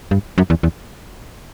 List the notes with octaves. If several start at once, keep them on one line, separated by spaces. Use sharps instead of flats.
G2
F#2
E2
E2